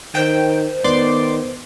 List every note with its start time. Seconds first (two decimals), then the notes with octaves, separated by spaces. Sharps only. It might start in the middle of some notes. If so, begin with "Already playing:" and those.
0.15 D#3 C5 G5
0.84 D#3 B3 D5 C6 D6